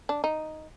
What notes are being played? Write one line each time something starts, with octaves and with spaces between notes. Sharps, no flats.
D4
D#4